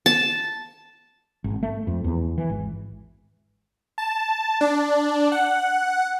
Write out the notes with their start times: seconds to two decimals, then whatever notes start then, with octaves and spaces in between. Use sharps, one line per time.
0.06 A5
1.44 G#1
1.63 A3
1.87 F2
2.04 E2
2.38 E3
2.50 G#1
3.98 A5
4.61 D4
5.32 F#5